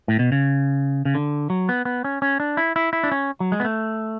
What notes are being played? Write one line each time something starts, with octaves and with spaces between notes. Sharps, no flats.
A2
B2
C#3
C#3
D3
F#3
B3
B3
C#4
C#4
D4
E4
E4
E4
D4
C#4
F#3
G#3
B3
A3